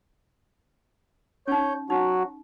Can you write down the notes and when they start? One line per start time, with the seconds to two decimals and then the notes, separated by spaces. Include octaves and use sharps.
1.48 C#4 D#4 C#5 G6
1.90 F#3 D#4 F#4